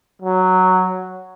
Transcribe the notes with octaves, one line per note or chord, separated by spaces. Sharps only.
F#3